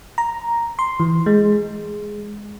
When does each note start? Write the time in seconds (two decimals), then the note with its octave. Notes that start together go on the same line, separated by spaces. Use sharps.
0.18 A#5
0.79 C6
1.00 E3
1.26 G#3